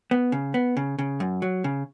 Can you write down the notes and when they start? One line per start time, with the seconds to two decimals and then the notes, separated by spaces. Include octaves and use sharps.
0.11 B3
0.32 C#3
0.54 B3
0.77 C#3
0.99 C#3
1.20 F#2
1.42 F#3
1.64 C#3